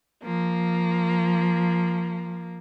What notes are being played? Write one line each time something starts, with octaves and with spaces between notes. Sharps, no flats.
F3 A#3